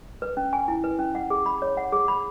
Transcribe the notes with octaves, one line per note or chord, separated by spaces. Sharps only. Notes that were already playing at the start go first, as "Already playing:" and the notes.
B4
C#4
G#5
E4
B4
C#4
F#5
G#4
B5
C#5
F#5
G#4
B5